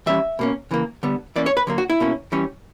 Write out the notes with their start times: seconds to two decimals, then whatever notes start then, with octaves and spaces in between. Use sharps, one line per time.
0.06 E3 G3 C#4 E5
0.39 B2 A#3 C#4
0.71 C#3 E3 A#3
1.03 D3 G3 B3
1.36 E3 A#3 C#4 D5
1.46 C#5
1.57 B4
1.67 D3 F#3 A#3
1.78 F#4
1.90 E4
2.00 B2 A#3 C#4
2.32 E3 G3 C#4